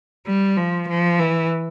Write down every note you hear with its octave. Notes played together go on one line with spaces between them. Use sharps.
G3
F3
F3
E3